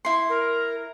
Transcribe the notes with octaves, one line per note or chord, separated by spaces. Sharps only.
E4 C6
A#4